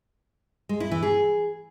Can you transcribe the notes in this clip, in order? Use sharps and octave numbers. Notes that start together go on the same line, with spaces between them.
G#3
E4
E3
G#4